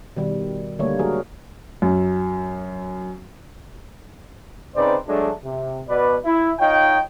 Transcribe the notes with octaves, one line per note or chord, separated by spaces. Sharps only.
B2 D#3 G3
D3 G3 A3 A#3 C#5
F#3 F#4 G#4 A#4
F#2
C#3 C4 D#4 B4 C5 D5
F#3 G#3 A3 D4
C3
B2 B4 D5
E4
D#4 F4 C#5 D#5 G5